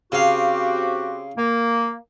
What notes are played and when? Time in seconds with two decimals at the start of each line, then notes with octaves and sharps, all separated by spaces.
0.12 C#3 C4 F#4 G4 F5
1.37 A#3